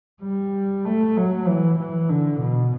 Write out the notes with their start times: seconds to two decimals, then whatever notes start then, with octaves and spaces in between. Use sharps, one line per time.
0.23 G3
0.85 A3
1.17 F#3
1.47 E3
1.79 E3
2.09 D3
2.41 B2